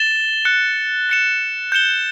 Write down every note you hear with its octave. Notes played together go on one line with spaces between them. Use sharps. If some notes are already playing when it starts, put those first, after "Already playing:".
Already playing: A6 E7 G7
F#6 C#7 G7
A6 C#7 E7
G6 C#7 E7 G7